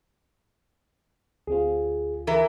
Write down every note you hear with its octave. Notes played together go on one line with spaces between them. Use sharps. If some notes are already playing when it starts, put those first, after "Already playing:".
D2 C4 F4 G#4
E3 A#4